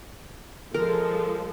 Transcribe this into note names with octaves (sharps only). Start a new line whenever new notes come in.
F3 G#3 A4 A#4